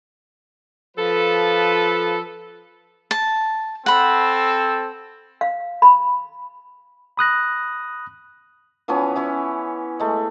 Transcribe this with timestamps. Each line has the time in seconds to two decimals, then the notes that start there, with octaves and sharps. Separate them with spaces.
0.97 F3 A4 B4
3.11 A5
3.86 C4 A4 F#5 B5
5.41 F5
5.82 B5
7.17 B5 D#6 F#6 A#6
8.88 E3 F3 B3 C#4
9.15 E3 C#4 E4
10.00 G#3 A3